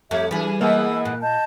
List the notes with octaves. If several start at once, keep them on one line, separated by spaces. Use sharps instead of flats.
F2 A3 G4 C#5 E5
E3 G3 D4 G#4 B4
E3 G#3 A#3 B3 E6
A#2 F#6
D#5 A5 G6